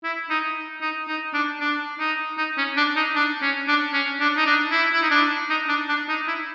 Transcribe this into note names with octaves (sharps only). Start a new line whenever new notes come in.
E4
D#4
D#4
D#4
D4
D4
D#4
D#4
C#4
D4
D#4
D4
C#4
D4
C#4
D4
D#4
D4
E4
E4
D#4
D4
D#4
D4
D4
D#4
E4